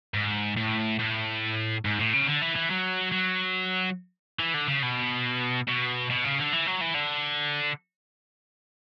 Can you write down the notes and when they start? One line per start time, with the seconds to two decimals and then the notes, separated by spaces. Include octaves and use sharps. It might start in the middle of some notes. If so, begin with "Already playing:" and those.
0.14 G#2
0.57 A2
0.99 A2
1.85 G#2
1.99 A2
2.13 C#3
2.27 D3
2.42 E3
2.55 E3
2.70 F#3
3.12 F#3
4.39 E3
4.54 D3
4.68 C#3
4.83 B2
5.68 B2
6.10 B2
6.24 C#3
6.39 D3
6.53 E3
6.67 F#3
6.81 E3
6.95 D3